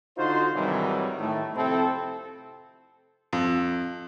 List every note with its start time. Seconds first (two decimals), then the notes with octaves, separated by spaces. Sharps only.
0.18 D3 D#4 F4 F#4 C5
0.54 G#2 C3 D#3 E3 F#3 G3
1.19 A2 D#3 A3
1.56 F2 C3 C4 E4 A4
3.33 F2